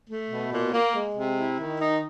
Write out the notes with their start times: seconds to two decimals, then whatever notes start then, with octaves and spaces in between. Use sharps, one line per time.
0.09 A3
0.30 B2
0.52 A#2
0.73 A#3
0.96 G#3
1.16 C3
1.38 E4
1.60 D#3
1.81 D#4